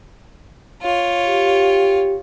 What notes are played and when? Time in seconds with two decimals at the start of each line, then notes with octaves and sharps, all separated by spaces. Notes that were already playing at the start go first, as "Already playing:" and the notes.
0.82 F4 C#5
1.26 G4